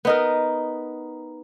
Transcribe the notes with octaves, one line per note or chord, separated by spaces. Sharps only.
B3 D#4 A#4